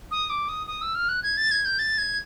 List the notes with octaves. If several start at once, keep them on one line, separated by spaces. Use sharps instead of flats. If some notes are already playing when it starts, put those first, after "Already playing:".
D#6
D6
D#6
D#6
E6
F6
F#6
G#6
A6
G#6
G6
A6
G#6